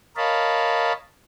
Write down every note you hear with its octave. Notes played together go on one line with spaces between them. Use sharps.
A#4 C#5 D#5 F5 A5 B5